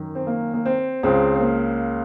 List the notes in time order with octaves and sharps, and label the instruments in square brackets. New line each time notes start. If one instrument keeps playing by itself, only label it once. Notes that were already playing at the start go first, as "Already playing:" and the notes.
Already playing: [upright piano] F#2 D#3
C4
A#3
A#3
C4
C#2 C#3 C4
C4
A#3